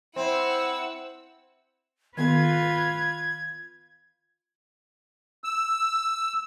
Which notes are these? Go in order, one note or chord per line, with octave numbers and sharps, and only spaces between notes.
C4 E4 C5 F#5 E6
D#3 B3 F4 A4 B4 G#6
E6